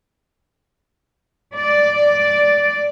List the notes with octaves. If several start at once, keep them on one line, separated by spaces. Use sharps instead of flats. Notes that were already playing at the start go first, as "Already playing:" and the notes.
D5